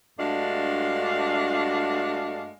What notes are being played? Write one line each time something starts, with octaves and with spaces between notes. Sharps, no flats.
G2 G#3 A3 D4 F#4 F5